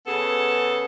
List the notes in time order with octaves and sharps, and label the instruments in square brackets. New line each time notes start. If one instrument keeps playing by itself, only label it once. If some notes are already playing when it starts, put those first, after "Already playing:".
[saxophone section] C#3 B3 G#4 A4